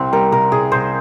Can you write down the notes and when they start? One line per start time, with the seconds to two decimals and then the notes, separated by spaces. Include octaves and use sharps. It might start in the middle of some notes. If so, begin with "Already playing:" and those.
Already playing: C2 C4
0.13 G3 A#4
0.32 C3 A#4
0.52 C2 G#4
0.72 C2 C5